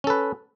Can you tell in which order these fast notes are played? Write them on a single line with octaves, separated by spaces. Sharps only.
C#4 A4 B4